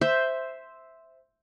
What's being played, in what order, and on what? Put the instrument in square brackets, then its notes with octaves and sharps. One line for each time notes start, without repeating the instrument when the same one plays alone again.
[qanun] C5 E5